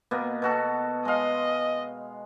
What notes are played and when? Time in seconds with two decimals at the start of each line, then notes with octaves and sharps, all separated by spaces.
0.11 B2 A#3 B3
0.42 B2 F#4 A4
1.05 G#3 D#5 F5